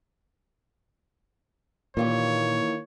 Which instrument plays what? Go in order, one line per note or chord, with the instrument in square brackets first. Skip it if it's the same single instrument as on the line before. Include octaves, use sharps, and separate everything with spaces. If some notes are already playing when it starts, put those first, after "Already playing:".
[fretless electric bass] A#2 [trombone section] D#3 A#3 [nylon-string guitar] E3 F4 G4 [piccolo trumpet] C#5